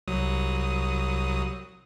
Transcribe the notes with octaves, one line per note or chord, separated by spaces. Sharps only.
C2 F#3 D#6